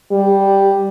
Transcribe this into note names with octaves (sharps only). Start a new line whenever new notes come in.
G3